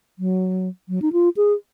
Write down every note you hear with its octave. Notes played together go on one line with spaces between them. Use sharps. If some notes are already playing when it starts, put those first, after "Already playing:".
F#3
F#3
D#4
F4
G#4